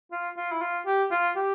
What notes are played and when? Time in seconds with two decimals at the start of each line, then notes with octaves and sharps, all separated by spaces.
0.12 F4
0.37 F4
0.52 E4
0.61 F4
0.86 G4
1.11 F4
1.36 G4